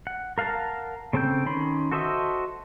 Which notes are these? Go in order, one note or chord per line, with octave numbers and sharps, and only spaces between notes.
F#5
A#4 F5 F#5 A5 A#5
C#3 C4 A4 G5 G6
D#3 C#4 B5 C6
F#4 A4 C5 D#5 E5